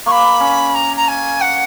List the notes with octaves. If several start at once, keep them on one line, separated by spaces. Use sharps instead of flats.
A#3 C#6
B5
C#4
A#5
A#5
G#5
F#5